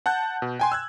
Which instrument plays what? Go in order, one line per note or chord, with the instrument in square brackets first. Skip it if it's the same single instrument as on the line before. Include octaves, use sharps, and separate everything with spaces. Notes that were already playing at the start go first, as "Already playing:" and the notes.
[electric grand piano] F#5 A5 F#6 G6
B2
G5 G#5 C6
E6 F#6 G#6